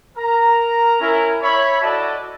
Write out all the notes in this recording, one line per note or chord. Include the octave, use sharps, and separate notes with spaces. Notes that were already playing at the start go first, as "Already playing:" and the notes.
A#4 A#5
C#4 E4 A#4
C#5 E5 B5
E4 F#4 A4 D5 D#5 A5